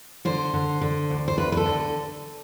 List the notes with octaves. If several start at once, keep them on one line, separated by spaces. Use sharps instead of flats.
D3 C5
D3
D3
D2
C5
D2 B4
B4
A4
D3